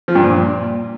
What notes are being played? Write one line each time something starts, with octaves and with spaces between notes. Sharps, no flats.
F3
G2
A#2